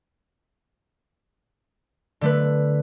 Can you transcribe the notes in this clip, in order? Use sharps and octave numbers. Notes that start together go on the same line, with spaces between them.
D3 A3 B4